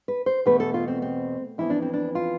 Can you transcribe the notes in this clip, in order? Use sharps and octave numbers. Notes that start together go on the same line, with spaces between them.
B4
C5
E2 B2 A3 B4
A4
F4
C4
C4
F2 E3 B3 E4
D4
C4
D4
F4